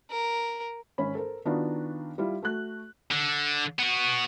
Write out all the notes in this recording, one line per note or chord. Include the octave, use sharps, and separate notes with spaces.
A#4
G#1 C#4 B5
A4 A#4 C5
D#3 B3 D4 D#4 F4 F#4
G3 E4 F4
A3 F#4 F#6
D3
B3 F#4